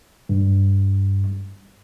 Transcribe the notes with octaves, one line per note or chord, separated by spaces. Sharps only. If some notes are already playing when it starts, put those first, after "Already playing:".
G2